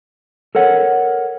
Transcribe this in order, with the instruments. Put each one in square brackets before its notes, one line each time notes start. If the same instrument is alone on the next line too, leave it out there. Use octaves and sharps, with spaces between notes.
[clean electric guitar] A4 A#4 C#5 F#5